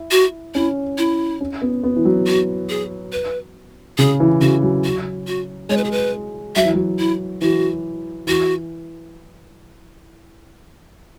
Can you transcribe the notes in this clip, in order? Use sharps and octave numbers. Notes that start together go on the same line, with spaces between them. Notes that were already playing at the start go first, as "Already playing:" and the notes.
Already playing: E4
F#4
C#4 E4
E4
C#4
B3
B3
E3
F#3
F#4
G#4
B4
C#3 G#4
E3
C#3 F#4
F#3
F#4
F#4
G#3 C#5
B4
G#4
B4
F#3 E5
E3
F#3
E4
E3 F#4
E3 F#4